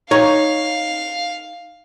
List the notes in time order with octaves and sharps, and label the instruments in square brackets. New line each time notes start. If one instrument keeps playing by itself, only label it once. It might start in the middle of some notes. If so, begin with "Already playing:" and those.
[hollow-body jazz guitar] D#4 C#5 [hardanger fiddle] F5